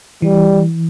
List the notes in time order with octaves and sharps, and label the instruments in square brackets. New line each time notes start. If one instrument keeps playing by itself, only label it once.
[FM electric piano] E3 [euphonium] G3